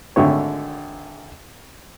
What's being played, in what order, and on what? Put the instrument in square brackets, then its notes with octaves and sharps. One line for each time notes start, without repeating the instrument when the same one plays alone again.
[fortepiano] G#1 D3 A3 C#5